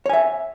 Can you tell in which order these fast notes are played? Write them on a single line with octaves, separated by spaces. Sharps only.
C#5 G#5 E5